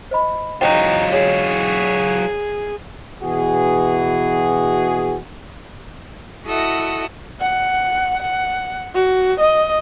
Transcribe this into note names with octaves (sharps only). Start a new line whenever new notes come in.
C5 D#5 B5
F#3 D#4 F4 C5 G5
G#4 C#5
B2 E3 F#4 G#4
E4 F#4 A4 D#5 E5 F#5
F#5
F#5
F#4
D#5